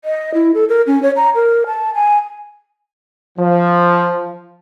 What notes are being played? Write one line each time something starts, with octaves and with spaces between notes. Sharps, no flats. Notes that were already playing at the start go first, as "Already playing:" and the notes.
D#5
E4
A4
A#4
C#4
C#5
A#5
A#4
A5
G#5
F3